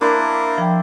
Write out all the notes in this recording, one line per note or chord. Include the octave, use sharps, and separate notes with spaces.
A#3 D4 E4 A#4 C5
F3 G5